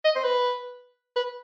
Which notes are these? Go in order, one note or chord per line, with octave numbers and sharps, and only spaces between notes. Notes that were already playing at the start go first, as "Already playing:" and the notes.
D#5
C5
B4
B4